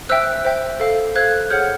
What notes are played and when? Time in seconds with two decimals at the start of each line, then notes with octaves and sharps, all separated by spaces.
0.09 C5 E5 G5 E6 F#6
0.45 C5 E5 G5
0.80 A4 C5 F5
1.15 A4 C5 F5 F#6 G#6
1.50 G#4 C#5 F#5 F6 G6